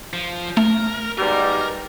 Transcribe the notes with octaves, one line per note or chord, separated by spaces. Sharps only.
F3
A3 A#4
G#2 B2 G3 A#4